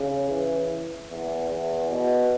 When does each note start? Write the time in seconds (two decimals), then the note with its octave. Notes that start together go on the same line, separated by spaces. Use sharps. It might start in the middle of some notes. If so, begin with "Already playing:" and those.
Already playing: C#3
0.29 E3
1.10 E2
1.49 E2
1.90 B2